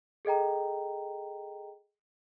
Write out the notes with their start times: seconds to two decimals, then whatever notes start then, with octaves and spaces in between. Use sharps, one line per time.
0.25 G#4 A4 D#5 G5 A#5